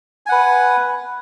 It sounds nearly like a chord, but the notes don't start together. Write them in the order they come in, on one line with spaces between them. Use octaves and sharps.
G#5 F#5 B4